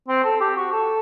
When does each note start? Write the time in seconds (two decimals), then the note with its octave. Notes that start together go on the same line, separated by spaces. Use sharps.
0.08 C4
0.24 A4
0.41 G4
0.57 F#4
0.73 A4